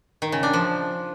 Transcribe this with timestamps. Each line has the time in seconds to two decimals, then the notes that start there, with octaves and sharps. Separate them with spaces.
0.22 D#3
0.32 C#3
0.43 D4
0.53 F3